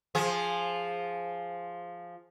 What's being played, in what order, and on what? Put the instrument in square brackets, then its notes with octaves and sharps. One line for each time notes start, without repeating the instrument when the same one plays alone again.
[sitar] F3 G#4